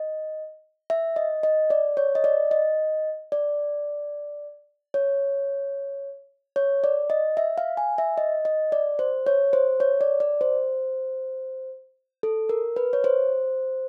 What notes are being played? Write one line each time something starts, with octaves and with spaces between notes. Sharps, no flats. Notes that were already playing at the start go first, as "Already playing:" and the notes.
Already playing: D#5
E5
D#5
D#5
D5
C#5
D#5
D5
D#5
D5
C#5
C#5
D5
D#5
E5
F5
G#5
E5
D#5
D#5
D5
C5
C#5
C5
C#5
D5
D5
C5
A4
A#4
B4
C#5
C5